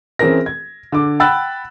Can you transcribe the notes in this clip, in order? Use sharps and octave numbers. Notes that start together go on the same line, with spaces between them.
E3 C4 C#4 G#4 A#4 A#6
G#6
D3 D6
F#5 G5 B5 E6 F#6 A6